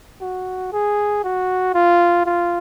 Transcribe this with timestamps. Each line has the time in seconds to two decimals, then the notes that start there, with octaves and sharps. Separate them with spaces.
0.21 F#4
0.73 G#4
1.24 F#4
1.74 F4
2.26 F4